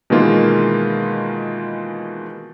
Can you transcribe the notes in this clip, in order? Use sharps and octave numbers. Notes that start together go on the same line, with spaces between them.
B2 D#3 E3 G#3 A#3 F4